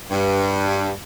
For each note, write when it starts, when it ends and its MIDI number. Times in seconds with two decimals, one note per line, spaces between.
0.11 0.90 43